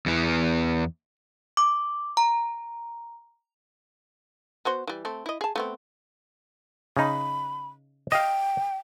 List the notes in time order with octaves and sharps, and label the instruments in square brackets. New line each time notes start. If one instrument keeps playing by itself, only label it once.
[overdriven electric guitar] E2 E3
[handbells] D6
A#5
[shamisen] B3 F#4 C5
E3 G3
A3 C4
E4 D#5
G#4 A5
A3 B3 C4
[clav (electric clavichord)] C#3 D#4 [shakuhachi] B5
[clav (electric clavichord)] D#5 F5 [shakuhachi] G5